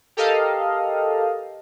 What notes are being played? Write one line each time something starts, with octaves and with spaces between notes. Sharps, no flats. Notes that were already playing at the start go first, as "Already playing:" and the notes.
G4 A4 A#4 D#5 F5